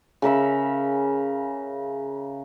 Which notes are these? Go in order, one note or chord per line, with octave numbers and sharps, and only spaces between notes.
C#3 A#4 E5 B5